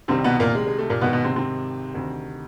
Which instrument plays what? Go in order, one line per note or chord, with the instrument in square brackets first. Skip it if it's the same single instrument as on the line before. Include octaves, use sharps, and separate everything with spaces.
[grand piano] C2 C3 D#3 G3 C4
B2 B3
A#2 A#3
G#3
G#3
A3
A#2 A#3
G#1 G#2 B2 D#3 B3
B2 B3
C3 C4
C3 C4
D2 C3 D#3